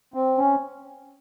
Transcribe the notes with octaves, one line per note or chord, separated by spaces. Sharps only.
C4
C#4